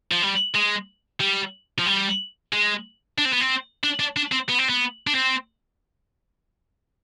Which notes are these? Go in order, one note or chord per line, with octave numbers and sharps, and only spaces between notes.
F3
G3
G#3
G3
F3
G3
G#3
D4
C4
B3
C4
D4
D4
D4
C4
B3
C4
B3
D4
C4